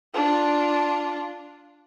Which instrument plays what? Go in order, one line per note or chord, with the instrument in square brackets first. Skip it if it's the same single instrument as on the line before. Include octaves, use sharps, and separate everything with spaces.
[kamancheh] D4 F4